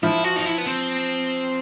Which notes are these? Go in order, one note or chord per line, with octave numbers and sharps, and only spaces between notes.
F3 E4
F#4
D#4
E4
B3
C4